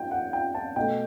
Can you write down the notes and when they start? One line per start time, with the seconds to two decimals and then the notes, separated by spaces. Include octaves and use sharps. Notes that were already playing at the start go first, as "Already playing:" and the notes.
Already playing: G5
0.11 F#5
0.33 G5
0.54 A5
0.76 B2 A3 G5